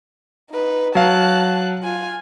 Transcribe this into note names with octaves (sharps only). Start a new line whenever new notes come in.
D#4 B4
F#3 F5 A5 F#6
F4 G#5